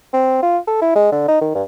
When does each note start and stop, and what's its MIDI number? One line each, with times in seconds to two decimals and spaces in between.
0.13 0.42 60
0.42 0.58 65
0.67 0.78 69
0.82 0.91 64
0.96 1.12 56
1.12 1.25 50
1.28 1.41 63
1.41 1.53 51
1.55 1.62 43